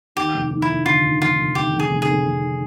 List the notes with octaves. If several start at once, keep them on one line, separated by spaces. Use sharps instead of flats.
D#2 G4
F1
D#2
E4
F1
D3 F4
D#2
F1 F4
F1
D#2 G4
F1
G#4
F1
G#4
F1
F1